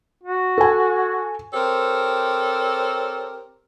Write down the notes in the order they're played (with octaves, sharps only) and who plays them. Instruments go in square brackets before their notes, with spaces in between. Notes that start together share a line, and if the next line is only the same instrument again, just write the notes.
[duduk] F#4
[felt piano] A4 G#5
[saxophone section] C4 G4 A4 A#4 C5 C#5